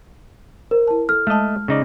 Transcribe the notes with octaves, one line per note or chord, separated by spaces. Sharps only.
A#4 C5
E4 A5
A4 F6
G#3 A3 D#5 A5
C#3 D#4 D5